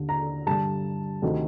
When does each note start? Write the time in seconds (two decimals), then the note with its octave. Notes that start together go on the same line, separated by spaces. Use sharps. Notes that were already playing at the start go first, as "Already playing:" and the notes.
Already playing: D#2 D3
0.09 A#5
0.47 G2 D3 A5
1.22 D2 C3 D#3